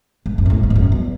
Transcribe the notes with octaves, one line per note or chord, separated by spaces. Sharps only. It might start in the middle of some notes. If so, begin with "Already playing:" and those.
G#2
F#2
C3
A2
G#2
E2
F#2
E2